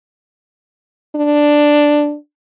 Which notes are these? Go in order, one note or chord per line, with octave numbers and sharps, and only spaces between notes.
D4